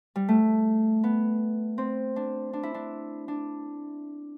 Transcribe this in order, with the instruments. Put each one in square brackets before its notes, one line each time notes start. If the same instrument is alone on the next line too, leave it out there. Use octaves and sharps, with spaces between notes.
[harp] G3
A3
B3
C4
D4
D4
E4
D4
D4